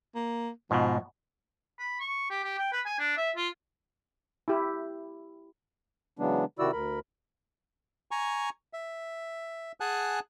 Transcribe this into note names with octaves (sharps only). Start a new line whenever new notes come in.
A#3
G#2 B2 F3
B5
C#6
G4
G4
G5
B4
G#5
D4
E5
F4
E4 G4
C#3 E3 F#3 G#3 B3 D4
C3 D#3 E4 F#4 D5 E6
D2 A#4 B5
G#5 A#5 C#6
E5
G#4 F#5 G#5 A5 F#6